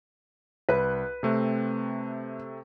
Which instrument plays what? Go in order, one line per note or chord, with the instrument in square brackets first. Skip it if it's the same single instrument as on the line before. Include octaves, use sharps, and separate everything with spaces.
[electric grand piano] C2 F#6 [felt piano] B4
[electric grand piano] C3 A3 C4